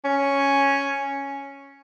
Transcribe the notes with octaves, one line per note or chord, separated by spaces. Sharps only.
C#4